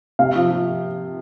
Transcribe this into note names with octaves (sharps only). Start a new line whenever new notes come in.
C3 F5
F3
F3